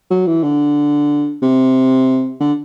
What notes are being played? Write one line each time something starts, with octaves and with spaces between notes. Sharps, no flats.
F#3
E3
D3
C3
D3